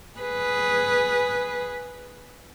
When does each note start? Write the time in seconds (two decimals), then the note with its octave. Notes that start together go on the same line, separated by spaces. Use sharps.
0.18 G#4 B4